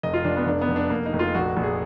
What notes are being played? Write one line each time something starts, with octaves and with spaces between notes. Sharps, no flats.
F1 D#5
F4
F1 D4
B3
F1 D4
B3
F1
D4
F1 A#3
D#4
F1
F4
A#1 F#4
A#1
G#4